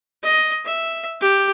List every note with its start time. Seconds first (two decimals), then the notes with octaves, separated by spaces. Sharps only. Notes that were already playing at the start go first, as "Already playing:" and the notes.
0.23 D#5
0.65 E5
1.21 G4